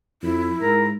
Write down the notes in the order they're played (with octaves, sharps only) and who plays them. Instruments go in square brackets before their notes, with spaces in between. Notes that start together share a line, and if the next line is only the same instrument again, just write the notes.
[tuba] F2 [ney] E4
[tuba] G#2 [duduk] A#4